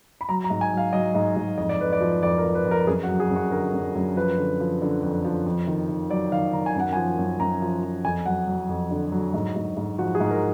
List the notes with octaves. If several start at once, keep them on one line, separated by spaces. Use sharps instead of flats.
B5
F#3 A#5
A#5
G#2
G#5
F#3
F5
F#3 D#5
G#2
G#2
F2 D#5
D5
F2 B4
D5
F3
F2 D5
A#4
F3
B4
F2
A#4
F#2 G#4
F#4
F#3
G#4
F#2
F#4
D3 A#4
F#2
F#2
F3 B4
D3
F3
D3
F2
F3
F2
D#3
D#3
F#3 D5
D#3 F5
D#3 A#5
G#5
F#2 F#5
F3 G#5
F#2
F#2 A#5
F3
F3
F2 G#5
F#3 F#5
F#3
F2
D3
F#3
G#2
G#2
G#2
F3 F#4
G#4
G#2
A#4